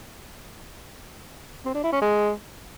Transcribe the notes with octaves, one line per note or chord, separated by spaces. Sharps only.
C4
D4
E4
C#4
G#3